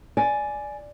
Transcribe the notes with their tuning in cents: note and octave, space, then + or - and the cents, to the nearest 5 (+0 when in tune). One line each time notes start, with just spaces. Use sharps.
D5 +0 G#5 +10